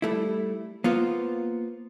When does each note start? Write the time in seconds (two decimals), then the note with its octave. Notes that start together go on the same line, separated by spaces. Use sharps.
0.02 G3 A3 E4
0.84 A#3 B3 F4 C5